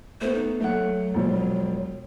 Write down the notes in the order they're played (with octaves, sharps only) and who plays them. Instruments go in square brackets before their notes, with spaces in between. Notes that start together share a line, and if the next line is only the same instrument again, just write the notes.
[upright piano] A3 B3 [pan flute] C5
[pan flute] D#4
[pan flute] F#3 [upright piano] A3 F#5
[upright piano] E1 F3